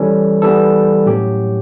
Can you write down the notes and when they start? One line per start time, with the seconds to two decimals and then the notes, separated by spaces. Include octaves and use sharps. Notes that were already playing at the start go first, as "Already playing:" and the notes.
Already playing: E3 G3 C#4 A4
0.42 E3 G3 B3 A4
1.06 A2 F#3 C#4 G4